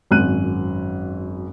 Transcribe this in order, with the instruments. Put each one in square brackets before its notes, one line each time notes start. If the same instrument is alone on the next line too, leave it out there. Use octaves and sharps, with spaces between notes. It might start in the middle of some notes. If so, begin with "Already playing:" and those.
[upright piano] G#1 F#2 F#6 D#7